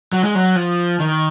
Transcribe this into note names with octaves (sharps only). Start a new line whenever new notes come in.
F#3
G#3
F#3
F3
D#3